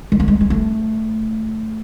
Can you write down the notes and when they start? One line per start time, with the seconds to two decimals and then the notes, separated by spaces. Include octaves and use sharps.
0.12 G#3
0.20 A3
0.28 G#3
0.41 G#3
0.50 A3